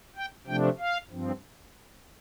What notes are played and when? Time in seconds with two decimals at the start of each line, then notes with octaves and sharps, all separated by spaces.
0.16 G5
0.47 C3 F3 A3 D4 G5
0.79 F5
1.10 G2 F3 C4